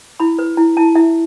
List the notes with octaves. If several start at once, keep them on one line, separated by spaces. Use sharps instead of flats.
E4 B5
B4
E4
E4 A5
E4 E5